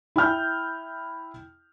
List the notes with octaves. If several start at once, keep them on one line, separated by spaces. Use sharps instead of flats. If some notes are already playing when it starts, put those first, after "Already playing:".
E4 G5 F6 G6